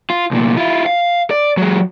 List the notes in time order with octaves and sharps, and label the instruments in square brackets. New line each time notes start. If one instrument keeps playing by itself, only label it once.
[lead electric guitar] F4
C2 A#2
E4 F4
F5
D5
F#3 G#3